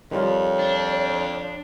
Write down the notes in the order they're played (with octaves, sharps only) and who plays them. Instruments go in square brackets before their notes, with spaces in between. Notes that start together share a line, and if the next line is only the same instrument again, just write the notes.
[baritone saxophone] F2 [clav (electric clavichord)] D#3 G3 F4 [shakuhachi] C#5
[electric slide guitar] D4